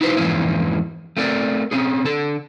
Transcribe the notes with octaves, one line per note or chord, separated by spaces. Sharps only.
D#4 E4 F#4 B4 C5
F2 G#2 E3 A#3 C#4 E4
A3 C4 A#4 D5
C4 C#4 G#4
D3 A4